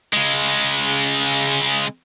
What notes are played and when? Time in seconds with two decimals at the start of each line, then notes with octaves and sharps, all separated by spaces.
0.13 C#3 G#3